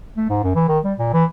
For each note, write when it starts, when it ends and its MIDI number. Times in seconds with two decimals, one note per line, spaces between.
0.17 0.26 57
0.29 0.42 44
0.44 0.54 42
0.55 0.66 52
0.68 0.79 51
0.84 0.94 55
0.98 1.09 46
1.13 1.24 52